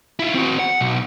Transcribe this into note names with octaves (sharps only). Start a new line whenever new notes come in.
E4 F4
C4 F#4
F#5
B1